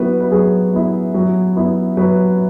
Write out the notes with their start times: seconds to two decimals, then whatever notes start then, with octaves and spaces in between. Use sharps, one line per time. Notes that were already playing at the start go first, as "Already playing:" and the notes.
Already playing: F#3 B3 E4 F#4 B4
0.20 B4
0.31 F#3 G#4
0.73 B3 E4
1.14 F#3
1.56 B3 E4
1.97 F#3 B4